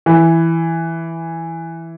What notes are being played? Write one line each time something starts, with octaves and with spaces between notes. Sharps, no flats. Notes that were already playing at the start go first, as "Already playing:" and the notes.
E3